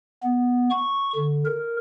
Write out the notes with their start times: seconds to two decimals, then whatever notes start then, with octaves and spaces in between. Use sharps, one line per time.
0.23 B3
0.70 C#6
1.15 D3
1.46 A#4